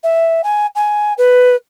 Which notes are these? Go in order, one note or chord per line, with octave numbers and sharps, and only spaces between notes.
E5
G#5
G#5
B4